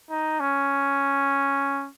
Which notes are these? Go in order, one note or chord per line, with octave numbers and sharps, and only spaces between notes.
D#4
C#4